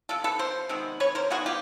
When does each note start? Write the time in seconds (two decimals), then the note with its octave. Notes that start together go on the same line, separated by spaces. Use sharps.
0.09 C3 F3 A4
0.24 A4 B4
0.39 A#4 C5
0.69 C3 D#3 G#3 B3
1.00 B4 C#5
1.15 A#4 C5
1.30 D#3 G3 B3 F#4 G#4
1.46 F4 G4